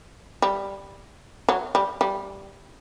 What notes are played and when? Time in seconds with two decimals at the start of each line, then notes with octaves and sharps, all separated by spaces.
0.42 G3
1.49 F#3
1.75 G3
2.01 G3